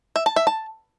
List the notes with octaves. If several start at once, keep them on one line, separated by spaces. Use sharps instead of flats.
E5
A5
E5
A5